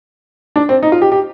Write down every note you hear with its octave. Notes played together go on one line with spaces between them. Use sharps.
D4
C4
D#4
F4
G4
G4